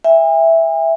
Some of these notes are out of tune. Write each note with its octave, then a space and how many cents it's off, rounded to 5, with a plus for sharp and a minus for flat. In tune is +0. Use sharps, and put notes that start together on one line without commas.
E5 +0 G#5 -45